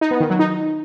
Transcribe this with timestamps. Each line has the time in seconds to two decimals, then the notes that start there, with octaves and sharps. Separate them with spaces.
0.01 D#4
0.11 B3
0.20 D#3
0.30 F#3
0.39 D#4